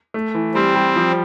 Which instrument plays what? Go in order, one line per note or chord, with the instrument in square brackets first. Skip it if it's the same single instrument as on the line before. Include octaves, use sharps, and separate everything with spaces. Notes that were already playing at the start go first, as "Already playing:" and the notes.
[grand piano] A3
E3
[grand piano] G3 [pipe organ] C4
[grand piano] G3
F3